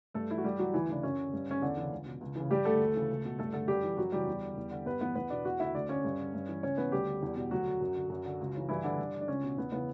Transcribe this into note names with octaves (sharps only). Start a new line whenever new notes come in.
G2 A3 A4
E3 E4
F#4
G2 G3 G4
E3 F#3 F#4
D2 E3 E4
C#3 E3 D4
F#2 C#4
D3
G2
D3 C#4
E2 D3 D4
C#3 E3
C#2
B2
C#2
C#3 E3
G2 G3 G4
D3 A3 A4
D2
C#3 E3
C#2
B2
G2 A3 A4
D3 A3 A4
F#2 G3 G4
E3
F#2 F#3 F#4
C#3 E3 G3 G4
E2
D3
E2
D3
G2 B3 B4
E3 B3 B4
E2 B3 B4
B2 D4 D5
E2 F#4 F#5
D3 E4 E5
D2 D4 D5
D3 C#4 C#5
G2
D3
G2
E3
C#2 C#4 C#5
C#3 E3 B3 B4
D2 G3 G4
D3
E2
B2
D2 F#3 F#4
D3
F#2
D3
F#2
D3
C#2
C#3 E3
G2 E3 E4
D3 D4
G2
D3
D4
C#2 C#4
B2
E2 B3
C#3 E3 B3